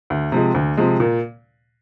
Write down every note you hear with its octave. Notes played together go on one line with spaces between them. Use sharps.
D2
C3 F3 G#3
D2
C3 F3 G#3
A#2